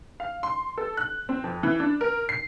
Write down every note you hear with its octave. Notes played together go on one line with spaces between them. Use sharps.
F5
C6
A4
F#6
C4
F2
E3
D4
A#4
C7